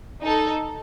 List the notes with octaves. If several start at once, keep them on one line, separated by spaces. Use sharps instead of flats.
D#4 A4